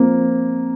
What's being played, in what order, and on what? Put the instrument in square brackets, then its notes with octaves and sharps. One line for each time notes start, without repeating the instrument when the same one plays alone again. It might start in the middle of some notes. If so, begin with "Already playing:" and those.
Already playing: [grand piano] F3 A#3 [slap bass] C4